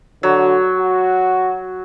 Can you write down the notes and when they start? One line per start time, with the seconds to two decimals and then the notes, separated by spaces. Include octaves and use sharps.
0.23 D3 F#3
0.78 F#4